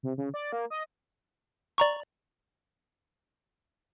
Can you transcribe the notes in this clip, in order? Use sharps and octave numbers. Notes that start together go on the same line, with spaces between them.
C3
C#3
D5
A#3
D#5
D5 A#5 C#6